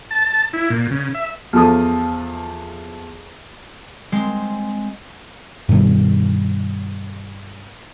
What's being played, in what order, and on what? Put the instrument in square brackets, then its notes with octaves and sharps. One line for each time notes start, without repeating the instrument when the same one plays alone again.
[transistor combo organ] A5
E4
A#2
C#3
E5
[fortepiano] E2 F3 A4 D#6
[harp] G#3 C4
[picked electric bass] G2 B2 D#3 G3